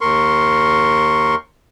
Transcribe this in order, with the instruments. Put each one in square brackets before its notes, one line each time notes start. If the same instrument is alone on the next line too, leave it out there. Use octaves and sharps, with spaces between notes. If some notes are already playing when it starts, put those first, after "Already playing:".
[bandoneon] D#2 A#4 C6 C#6